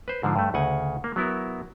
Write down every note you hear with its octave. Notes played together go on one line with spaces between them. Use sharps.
B4 C5
G#2 D3 F3
G2 A3
D2 C#3 F#5 G#5
A#3
F#3 B3 E4 A#4